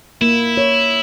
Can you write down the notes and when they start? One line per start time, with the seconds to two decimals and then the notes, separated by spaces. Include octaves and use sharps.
0.21 A#3 E4
0.57 C#5